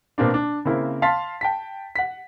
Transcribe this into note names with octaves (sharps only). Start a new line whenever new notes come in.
B2 A#3 C4 D4
D4
C#3 A#3 C4 E4
F5 A5 C6 A6 B6
G5 A5 B6
F#5 B6